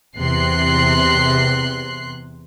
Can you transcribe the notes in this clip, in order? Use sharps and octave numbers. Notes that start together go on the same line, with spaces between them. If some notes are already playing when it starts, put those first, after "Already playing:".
E2 C3 C6 F#6 C7